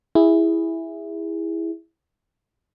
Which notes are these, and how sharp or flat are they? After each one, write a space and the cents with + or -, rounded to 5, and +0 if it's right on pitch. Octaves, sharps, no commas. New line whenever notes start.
E4 +0 G#4 -25